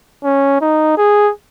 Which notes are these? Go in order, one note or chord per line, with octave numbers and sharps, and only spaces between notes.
C#4
D#4
G#4